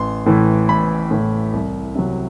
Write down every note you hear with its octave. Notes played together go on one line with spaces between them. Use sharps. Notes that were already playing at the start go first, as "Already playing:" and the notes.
Already playing: A1 C6
A2 E3
A1 B5
A2 E3
C2
C3 F#3